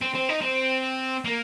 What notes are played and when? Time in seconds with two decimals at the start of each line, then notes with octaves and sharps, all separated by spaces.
0.01 C4
0.15 C4
0.29 D#4
0.42 C4
1.25 A#3